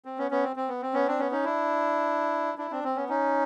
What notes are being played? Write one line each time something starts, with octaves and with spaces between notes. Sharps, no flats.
C4
B3 C#4
B3 C#4
C4
C4
B3
C4
B3 C#4
C4 D4
B3 C#4
C#4 D#4
D4 E4
D4 E4
C4 D4
C4
B3 C#4
C#4 D#4